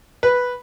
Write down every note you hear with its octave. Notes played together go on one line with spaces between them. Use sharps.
B4